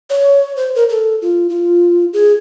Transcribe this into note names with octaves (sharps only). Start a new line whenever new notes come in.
C#5
C5
A#4
A4
F4
F4
G#4